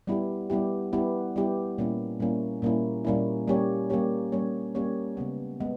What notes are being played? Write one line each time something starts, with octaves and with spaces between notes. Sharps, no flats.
G3 B3 E4 G4
G3 B3 E4 G4
G3 B3 E4 G4
G3 B3 E4 G4
A#2 G3 A#3 C#4 E4
A#2 G3 A#3 C#4 E4
A#2 G3 A#3 C#4 E4
A#2 G3 A#3 C#4 E4
G3 A#3 C#4 G4 C#5
G3 A#3 C#4 G4 C#5
G3 A#3 C#4 G4 C#5
G3 A#3 C#4 G4 C#5
C#3 G#3 B3
G#3 B3